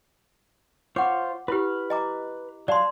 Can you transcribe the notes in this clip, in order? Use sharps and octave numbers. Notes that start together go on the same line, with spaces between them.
F4 C5 C#5 F#5 D6
E4 G4 B4 B5 F6
D#5 A#5 D6
F#3 D5 F5 A5 C6